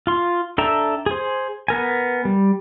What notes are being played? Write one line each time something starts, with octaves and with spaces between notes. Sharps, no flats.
F4 C6
D4 A4 E5 G5 A#5
G#4 C5
B3 A#4 G#5
G3